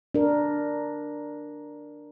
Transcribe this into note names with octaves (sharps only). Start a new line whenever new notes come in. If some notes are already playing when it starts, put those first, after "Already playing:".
D4 A#4